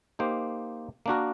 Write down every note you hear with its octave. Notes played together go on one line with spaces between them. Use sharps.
A#3 D#4 G4 C5
A#3 D4 F#4 A#4